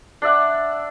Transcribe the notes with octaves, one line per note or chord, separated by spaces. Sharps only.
D4 D5 E5 F#5